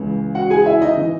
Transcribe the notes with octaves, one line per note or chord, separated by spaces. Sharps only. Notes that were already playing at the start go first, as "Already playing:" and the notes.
Already playing: C#2 C#3 E3
F#4 F#5
G#4 G#5
E4 E5
D#4 D#5
E3